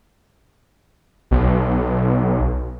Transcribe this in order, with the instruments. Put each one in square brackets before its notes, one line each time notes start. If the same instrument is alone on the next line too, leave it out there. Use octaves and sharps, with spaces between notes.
[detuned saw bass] B1